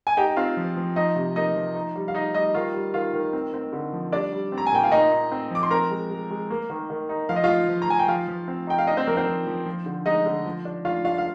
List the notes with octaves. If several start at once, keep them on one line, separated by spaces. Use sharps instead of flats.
G#5
D#4 G4 G5
C4 F4 F5
F3
F3
F3 D#4 D#5
C3
A#3 D#4 D#5
F3
D#4
G3
F5
D#4 D#5
G3 D#4 D#5
D#3 F4 F5
G3
D#3 F4 F5
D#3
C4
C4
D3
F3
G3 D4 D5
G3
C4
A#5
G#5
A#2 G5
F5
A#2 D#4 D#5
D#4
C4
F3 D6
C6
C4 A#4 A#5
G#3
G#3
G#3
A#3
D#3
D#3
D#4
F3 F5
D#5
F3 F4 F5
F3
A#5
F3 G#5
G5
F3 F4 F5
F3
C4
D#4 G5
F5
D4 D#4 D#5
C4 C5
F3 A#3 A#4
C4 C5
F3
F3
F3
D3
G#3 D#4 D#5
D3
F3
D4
D4 F4 F5
D4 F4 F5
F5